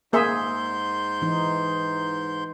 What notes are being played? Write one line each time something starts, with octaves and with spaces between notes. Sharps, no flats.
G#2 A#3 G#4 E5 C6 G6
E3 D#4